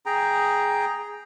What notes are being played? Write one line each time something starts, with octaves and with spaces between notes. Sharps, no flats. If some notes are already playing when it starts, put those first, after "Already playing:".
G#4 G5 A#5